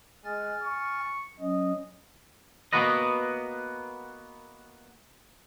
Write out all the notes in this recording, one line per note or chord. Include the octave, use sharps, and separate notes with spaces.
G#3 G#5 F6 A6
C#6
F#3 C#4 D#5
A#3 B3 F#4 B4 D#5